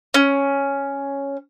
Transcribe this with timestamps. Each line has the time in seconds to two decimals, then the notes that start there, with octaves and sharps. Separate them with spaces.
0.14 C#4